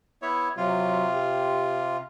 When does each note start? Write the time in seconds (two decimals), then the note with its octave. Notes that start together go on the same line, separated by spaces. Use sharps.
0.22 B3 E4 C#5
0.57 C3 F#3 F4
1.12 G4